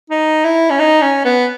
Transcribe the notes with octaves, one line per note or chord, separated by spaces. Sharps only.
D#4
E4
C#4
D#4
C#4
B3